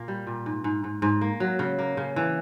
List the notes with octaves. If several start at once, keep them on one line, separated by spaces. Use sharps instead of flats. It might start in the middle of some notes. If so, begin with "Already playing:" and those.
Already playing: A#2 A#3
G3
A#2
G#2
G#2
G#2
G#2
A#3
F#3
C#3
A#3
C#3
E3